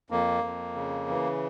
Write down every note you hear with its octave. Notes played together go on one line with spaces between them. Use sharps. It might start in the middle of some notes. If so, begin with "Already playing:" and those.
F2 A#3
F2
C#3
E3